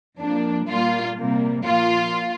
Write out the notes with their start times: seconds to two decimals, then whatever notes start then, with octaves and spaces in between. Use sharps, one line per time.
0.19 F2 F3 A#3 D4
0.68 A#2 G3 A#3 F4
1.18 C3 G3 A#3
1.65 A#2 F3 A#3 F4